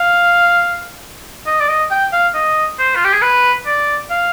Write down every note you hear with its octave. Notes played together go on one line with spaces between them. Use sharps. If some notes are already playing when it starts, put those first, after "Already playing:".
Already playing: F5
D#5
D5
D#5
G5
F5
D#5
C5
F4
G4
G#4
B4
D5
F5